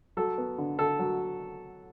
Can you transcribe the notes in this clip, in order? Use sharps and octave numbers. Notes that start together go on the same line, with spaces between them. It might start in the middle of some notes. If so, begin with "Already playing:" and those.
F#3 A4
B3
D3
D3 A4
F#3